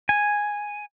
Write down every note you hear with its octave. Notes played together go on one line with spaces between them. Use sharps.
G#5